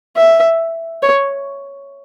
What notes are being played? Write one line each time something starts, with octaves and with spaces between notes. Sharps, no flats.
E5
C#5